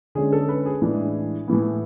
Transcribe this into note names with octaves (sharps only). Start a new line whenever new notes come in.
D3 G#3 C#4 G#4
A4
B4
G#4
A2 E3 G#3 D4
A2 E3 B3